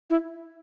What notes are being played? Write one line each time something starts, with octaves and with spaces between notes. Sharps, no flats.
E4